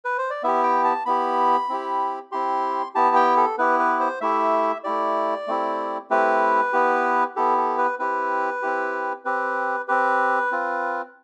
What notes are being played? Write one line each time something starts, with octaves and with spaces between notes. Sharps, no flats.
B4
C5
D5
B3 E4 G4 E5
G5
A5
B3 E4 G4 B5
C4 E4 G4
C4 E4 G4 C6
B3 E4 G4 A5
G5
A4
B3 E4 G4 B4
B4
C5
A3 E4 G4 E5
A3 E4 G4 D5
A3 C4 E4 G4
A3 C4 E4 G4 B4
B3 E4 G4
B3 E4 G4 A4
A4
B4
C4 E4 G4 B4
C4 E4 G4
C4 G4 B4
C4 G4 B4
C4 F4